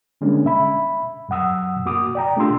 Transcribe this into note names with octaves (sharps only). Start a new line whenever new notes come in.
D3 G3 G#3 A#3 C#4 D4
E5 B5
F#2 F#3 F#5 D#6 E6
A#3 F#4 D6 D#6
D5 G5 A#5
A3 D4 F4 G4 C6 E6